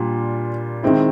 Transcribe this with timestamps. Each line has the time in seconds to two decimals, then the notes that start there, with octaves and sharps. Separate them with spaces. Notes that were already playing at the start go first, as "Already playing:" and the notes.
Already playing: A#2 G3 D4 F4
0.83 D#3 G#3 C4 E4